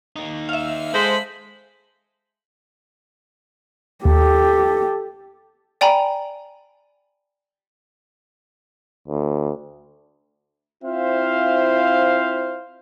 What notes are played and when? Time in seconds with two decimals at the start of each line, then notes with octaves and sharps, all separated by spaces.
0.16 A#3 D#4
0.49 E5 F5
0.94 G#3 A4 C5 B5
4.05 D#2 G4 A4
5.81 D5 G5 G#5 A#5 B5
9.08 D2
10.84 C4 E4 F4 C5 E5 F5